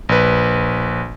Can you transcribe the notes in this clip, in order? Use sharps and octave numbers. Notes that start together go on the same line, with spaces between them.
A#1 B4